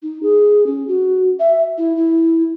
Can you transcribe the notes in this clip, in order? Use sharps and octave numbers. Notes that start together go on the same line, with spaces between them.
D#4
G#4
C#4
F#4
E5
E4
E4